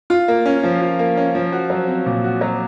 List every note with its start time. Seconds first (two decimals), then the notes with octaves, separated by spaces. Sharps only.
0.10 F4
0.28 A#3
0.46 C#4
0.63 F3
0.81 F4
0.99 A#3
1.17 C#4
1.35 F3
1.52 F#4
1.70 F#3
1.88 C4
2.06 A#2
2.24 F#4
2.41 F#3